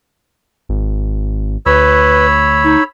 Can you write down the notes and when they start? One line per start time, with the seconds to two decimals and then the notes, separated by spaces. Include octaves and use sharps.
0.69 G#1
1.66 D2 B4 C#5 B5 E6
2.64 D#4